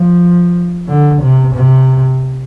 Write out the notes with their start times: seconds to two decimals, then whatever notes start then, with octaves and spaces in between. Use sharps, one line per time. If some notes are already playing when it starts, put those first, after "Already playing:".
Already playing: F3
0.88 D3
1.21 C3
1.54 C3